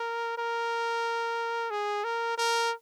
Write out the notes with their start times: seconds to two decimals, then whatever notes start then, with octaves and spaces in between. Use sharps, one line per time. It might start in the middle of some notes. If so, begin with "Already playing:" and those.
Already playing: A#4
0.38 A#4
1.70 G#4
2.04 A#4
2.38 A#4